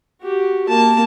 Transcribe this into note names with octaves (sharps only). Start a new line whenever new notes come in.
F#4 G4
A#3 A5